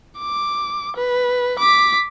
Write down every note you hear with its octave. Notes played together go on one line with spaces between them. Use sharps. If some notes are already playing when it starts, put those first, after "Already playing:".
D6
B4
D6 B6